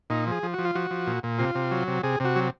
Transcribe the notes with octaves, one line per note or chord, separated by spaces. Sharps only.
A#2 D#4
F3 G#4
F3
F3 F#4
F4
F3 F#4
F3
A#2
A#2
C3 F4
C3
F#3
C3
C3 G#4
C3 F#4
F#3